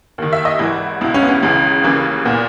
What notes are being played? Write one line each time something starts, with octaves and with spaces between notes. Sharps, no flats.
D#2 D#3
E5
D#5
G#1 G#2 E3 E4
C#2 B2 E4
C#4
B3
C#4
C#2 C#3 E3
D#2 C#3 E3
A#2 B3